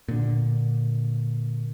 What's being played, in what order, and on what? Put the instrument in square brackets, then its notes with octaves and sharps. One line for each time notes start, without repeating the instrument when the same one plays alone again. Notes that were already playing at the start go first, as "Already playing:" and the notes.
[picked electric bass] A#2 D3